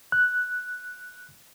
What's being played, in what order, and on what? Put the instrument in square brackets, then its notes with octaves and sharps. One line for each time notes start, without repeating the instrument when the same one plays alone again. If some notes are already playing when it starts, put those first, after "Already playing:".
[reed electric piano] F#6